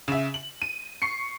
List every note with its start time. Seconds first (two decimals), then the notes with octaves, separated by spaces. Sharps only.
0.08 C#3 E5
0.34 F#7
0.62 D#7
1.02 C#6 C7 C#7